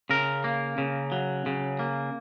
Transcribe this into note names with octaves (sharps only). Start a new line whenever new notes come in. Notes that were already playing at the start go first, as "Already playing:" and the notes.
C#3 A#4
A#3
C#3
F#3
C#3
A#3